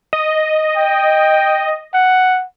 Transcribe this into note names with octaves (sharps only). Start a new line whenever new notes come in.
D#5
G5
F#5